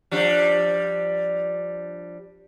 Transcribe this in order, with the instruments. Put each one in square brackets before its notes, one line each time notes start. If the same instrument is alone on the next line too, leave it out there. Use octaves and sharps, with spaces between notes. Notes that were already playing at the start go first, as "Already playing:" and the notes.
[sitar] F3 G3 D4